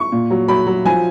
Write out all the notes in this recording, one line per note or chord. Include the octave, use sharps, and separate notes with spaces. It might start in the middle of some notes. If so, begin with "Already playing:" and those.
Already playing: C#6
A#2
F#3
F#3 B5
F#3
F3 G#5